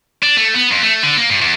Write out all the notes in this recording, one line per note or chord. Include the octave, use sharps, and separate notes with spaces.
D4
A3
B3
F2
A3
D3
A#3
G2
E2